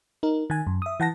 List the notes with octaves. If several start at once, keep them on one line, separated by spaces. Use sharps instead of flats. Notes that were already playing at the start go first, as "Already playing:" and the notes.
D#4 A#4
D#3 G#5
F#2
E5 D#6
E3 F#5 A5 A#6